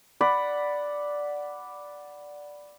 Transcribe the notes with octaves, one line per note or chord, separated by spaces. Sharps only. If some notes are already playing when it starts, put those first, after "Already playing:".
D5 F#5 B5